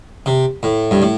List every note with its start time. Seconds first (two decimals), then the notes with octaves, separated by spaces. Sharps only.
0.26 C3
0.63 A2
0.91 G2
1.02 A2